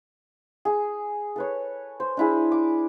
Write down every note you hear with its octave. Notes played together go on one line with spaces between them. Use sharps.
G#4
A4 B4 C#5
C5
D4 E4 G#4
D6